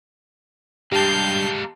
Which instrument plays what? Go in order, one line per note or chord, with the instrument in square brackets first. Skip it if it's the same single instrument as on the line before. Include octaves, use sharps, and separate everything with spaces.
[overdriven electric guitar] G2 [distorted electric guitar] G#3 A#3 [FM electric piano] G4 A5 [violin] F5 G6